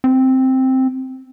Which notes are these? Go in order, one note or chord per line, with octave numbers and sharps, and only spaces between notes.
C4